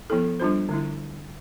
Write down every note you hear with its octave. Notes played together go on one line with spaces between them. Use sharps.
F3 B3 E4 A4
G3 D4 F4 C5
D3 A3 E4